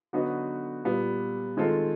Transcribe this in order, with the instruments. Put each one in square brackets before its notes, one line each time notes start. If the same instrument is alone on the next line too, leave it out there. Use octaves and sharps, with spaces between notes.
[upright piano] D3 F#3 B3 D#4 F#4
A#2 G3 B3
D#3 G#3 C4 F4 A4